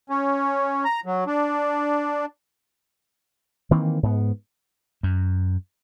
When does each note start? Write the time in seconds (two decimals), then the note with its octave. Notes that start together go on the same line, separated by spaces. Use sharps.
0.10 C#4
0.85 A#5
1.06 F#3
1.27 D4
3.71 D#3 E3 A#3 C4
4.03 G#2 B3
5.03 F#2